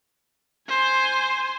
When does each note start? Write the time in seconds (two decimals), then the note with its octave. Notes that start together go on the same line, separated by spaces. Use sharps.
0.69 C5 G#5